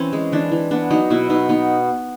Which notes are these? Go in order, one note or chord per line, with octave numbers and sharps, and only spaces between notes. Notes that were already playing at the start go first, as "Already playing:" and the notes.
Already playing: E3 C4 C#4
G#3
E3 D4
E3
B3 D4
F#3 D#4
B2 E4
B2 D#4
B3 D#4